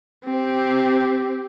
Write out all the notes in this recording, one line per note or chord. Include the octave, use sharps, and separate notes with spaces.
C4 G4